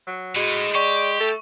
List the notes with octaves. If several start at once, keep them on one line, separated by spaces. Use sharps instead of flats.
F#3
A2 G#3 F#4
G4 D5 C#6
A3 A4